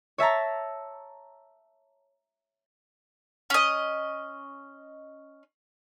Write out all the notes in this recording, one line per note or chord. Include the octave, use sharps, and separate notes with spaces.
C#5 E5 A5 A#5
C#4 D#5